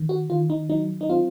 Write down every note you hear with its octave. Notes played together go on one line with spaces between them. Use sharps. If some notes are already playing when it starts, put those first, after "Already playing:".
Already playing: D#3
F#4
D#3 F4
D#4
F#3 D#4
D#4
C4 F4